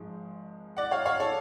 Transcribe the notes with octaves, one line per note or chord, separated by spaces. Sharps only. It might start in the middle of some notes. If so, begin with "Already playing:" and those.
Already playing: G#1 G#2 F3 G#3
D5 F#5
C#5 F5
C#5 F5
A4 C#5